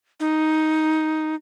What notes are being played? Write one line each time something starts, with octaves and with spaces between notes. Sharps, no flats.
D#4